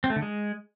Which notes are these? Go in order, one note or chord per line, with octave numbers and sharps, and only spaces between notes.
C4
A3
D3
G#3